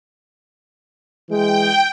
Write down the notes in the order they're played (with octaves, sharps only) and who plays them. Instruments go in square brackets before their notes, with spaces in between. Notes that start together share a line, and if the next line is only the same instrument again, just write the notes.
[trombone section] E3 G#3 [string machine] G5